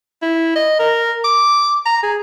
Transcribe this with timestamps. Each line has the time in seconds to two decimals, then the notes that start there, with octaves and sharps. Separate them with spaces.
0.22 E4
0.56 D#5
0.79 A#4
1.24 D6
1.85 A#5
2.03 G#4